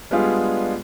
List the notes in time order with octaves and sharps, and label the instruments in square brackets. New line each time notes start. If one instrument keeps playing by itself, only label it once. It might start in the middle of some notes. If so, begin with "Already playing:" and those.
[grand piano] G3 G#3 B3 D4 F4 G#4